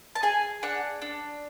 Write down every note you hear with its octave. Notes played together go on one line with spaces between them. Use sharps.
A5
G#4 G#5
D4 F#5
D4